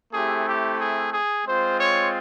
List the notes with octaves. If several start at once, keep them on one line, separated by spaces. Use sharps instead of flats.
A3 C4 E4 G4 G#4
G4
G#4
G#4
G#3 C4 F4 C5
C#5